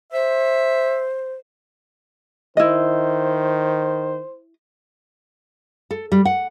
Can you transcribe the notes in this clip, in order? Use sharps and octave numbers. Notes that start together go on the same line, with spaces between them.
C5 E5
D#3 E4 C5 D#5
A4
G3
F#5